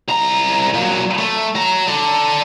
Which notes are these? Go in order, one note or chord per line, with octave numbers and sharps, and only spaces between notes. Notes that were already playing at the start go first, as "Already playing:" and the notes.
C2 A#5
A#2 F#3
A3
F#3 A#5
A4 D5